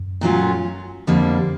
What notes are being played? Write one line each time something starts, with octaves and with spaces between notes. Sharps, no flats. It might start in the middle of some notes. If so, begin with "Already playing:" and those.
Already playing: F#2
A#2 F#3 A3 C#4 F4
F2 D3 G3 A#3